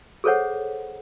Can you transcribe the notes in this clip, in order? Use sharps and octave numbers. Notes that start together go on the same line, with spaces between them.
G#4 A4 C5 C#5 F#5